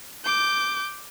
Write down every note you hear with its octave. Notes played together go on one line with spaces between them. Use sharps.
D6 G6